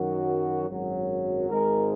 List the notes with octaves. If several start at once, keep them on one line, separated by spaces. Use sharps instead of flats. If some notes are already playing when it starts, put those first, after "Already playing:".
Already playing: F#2 D#3 F#3 F#4
G#1 F#2 F#3
G#1 G#2 G#3 A#4